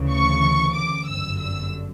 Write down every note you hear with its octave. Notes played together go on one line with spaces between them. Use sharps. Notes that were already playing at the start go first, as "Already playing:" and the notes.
Already playing: D2 C#3 E3
C#6
D6
G1 F#2 D3 E6
E6